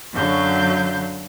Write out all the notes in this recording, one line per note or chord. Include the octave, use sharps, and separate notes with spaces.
F#2 D3 F#3 F5 G6